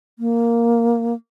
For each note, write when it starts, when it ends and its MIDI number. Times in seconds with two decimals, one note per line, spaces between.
0.19 1.14 58